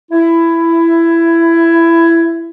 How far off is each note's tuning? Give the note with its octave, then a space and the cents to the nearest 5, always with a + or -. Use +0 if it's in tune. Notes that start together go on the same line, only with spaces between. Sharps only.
E4 +15